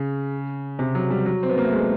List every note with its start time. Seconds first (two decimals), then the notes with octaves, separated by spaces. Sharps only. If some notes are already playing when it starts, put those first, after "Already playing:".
Already playing: C#3
0.79 C3
0.95 F#3
1.10 G3
1.26 F#3
1.43 C4
1.49 B3
1.57 A#3
1.65 A3
1.73 G#3